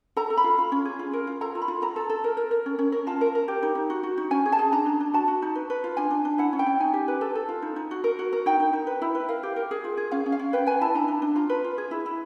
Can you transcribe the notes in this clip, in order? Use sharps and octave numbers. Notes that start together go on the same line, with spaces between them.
A4 A#5
A4
B5
F4
F4
C#4
G#4
F4
A#4
F4
A4 A#5
F4
B5
F4
A4 A#5
A4
A4
A#4
A#4
A#4
C#4
C#4
A#4
F4 A5
A#4
A#4
G4
D#4
D#4
F#4
F#4
D#4
C#4 G#5
G#4
A5
G#4
D4 A#5
D4
D4
F#4 A5
F#4
D#4
B4
B4
F4
D4 G#5
D4
D4
E4 F#5
C#4
G5
C#4
D#4 G#5
G4
B4
A4
A4
F4
D#4
D#4
F#4
A#4
F#4
A#4
D#4 G5
D#4
D#4
B4
E4
B4
A#4 F5
G4
A#4
G#4
F4
G#4
C#4 F5
C#4
F5
C#4
B4 G5
B4 G#5
E4 A5
D4 A#5
D4
D4
F4 A#5
B4
F4
G#4
E4
E4